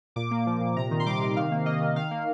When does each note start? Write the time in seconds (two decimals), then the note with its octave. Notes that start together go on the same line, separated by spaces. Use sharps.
0.16 A#2 D6
0.31 A#3
0.46 F3
0.61 A#2
0.76 C3 A#5
0.91 D#3
1.00 C6
1.06 G3 D6
1.21 C3
1.36 D#3 F5
1.52 A#3
1.66 A#3 D#5
1.81 D#3
1.96 D#3 F5
2.11 A#3